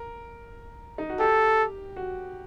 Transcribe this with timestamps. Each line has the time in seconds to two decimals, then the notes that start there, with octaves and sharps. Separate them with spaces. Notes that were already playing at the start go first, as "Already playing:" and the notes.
Already playing: A#4
0.98 D#4
1.10 F#4
1.19 G4 A4
1.96 F#4